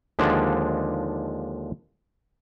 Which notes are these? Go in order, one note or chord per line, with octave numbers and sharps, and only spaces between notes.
D#2 D3 F3 G#3 D4